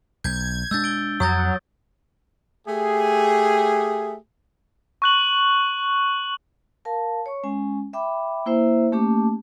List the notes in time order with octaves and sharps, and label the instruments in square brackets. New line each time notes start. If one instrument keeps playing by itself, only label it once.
[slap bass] B1 [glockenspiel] G6 [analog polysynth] G#6
[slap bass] G#3 D4 [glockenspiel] E6 G6 A6
[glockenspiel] D7 G7
[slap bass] F2 [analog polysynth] F#3 [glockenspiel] D#6 G6 A6
[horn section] A3 G4 G#4
[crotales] C#6 F#6 F#7
[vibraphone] A#4 F5 A5
C#5 C#6
G#3 C#4 G#5
E5 G5 B5 D6
A#3 E4 C5 E5
A3 A#3 C#4 G4 A5 D6